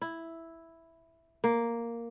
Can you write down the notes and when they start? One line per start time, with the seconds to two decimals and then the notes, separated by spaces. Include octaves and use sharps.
0.01 E4
1.44 A#3